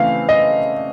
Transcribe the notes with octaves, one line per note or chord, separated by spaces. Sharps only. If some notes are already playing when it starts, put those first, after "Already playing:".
Already playing: C#3 E3 A3 C4 F5
D#5